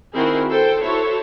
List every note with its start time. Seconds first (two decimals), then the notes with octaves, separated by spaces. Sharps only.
0.14 D#3 C4 E4 F#4 G#4 A#4
0.51 A4 C5 G5
0.82 E4 F#4 A4 C5 C#5